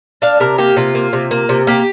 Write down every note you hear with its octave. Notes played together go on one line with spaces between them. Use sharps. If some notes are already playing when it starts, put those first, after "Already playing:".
D4 F5
C3 A#4
A#3 G4
C3 F4
A#3
C3
A#3
C3
A#3 G4